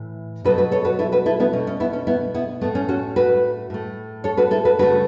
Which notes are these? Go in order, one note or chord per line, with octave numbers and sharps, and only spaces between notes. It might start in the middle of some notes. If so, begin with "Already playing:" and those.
Already playing: A2 E3
B2 F#3 A3 F#4 B4
F#4 B4
A4 C#5
F#4 B4
E4 A4
F#4 B4
E4 A4
B3 E4
B2 A3 C#4
C#4
B3 E4
C#4
B3 E4
B3 E4
A2 A3 B3
C#4
C#4 F#4
F#4 B4
A2 A3
A4 C#5
F#4 B4
E4 A4
F#4 B4
C#3 A3 F#4 B4